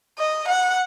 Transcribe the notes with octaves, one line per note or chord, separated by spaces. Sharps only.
D#5
F#5